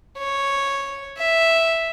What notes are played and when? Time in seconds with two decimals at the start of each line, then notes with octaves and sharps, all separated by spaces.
0.18 C#5
1.18 E5